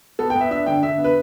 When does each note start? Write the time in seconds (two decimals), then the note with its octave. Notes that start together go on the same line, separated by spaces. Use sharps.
0.19 B3 A4
0.30 G5
0.35 B3
0.41 E5
0.51 D4 E5
0.66 D3 G5
0.83 D3 E5
0.98 B3
1.04 B4